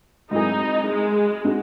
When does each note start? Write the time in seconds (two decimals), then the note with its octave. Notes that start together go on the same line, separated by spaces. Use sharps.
0.31 G#2 F#3 C4 D#4 E4 G#4
0.88 G#3
1.45 G#3 D#4 F#4